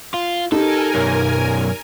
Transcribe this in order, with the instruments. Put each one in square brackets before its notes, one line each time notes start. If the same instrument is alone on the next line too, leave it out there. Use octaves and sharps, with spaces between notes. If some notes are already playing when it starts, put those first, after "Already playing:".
[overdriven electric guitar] F4
[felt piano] D#4 G4 [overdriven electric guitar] A4 [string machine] A#4 G#5
[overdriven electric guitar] B1 F#2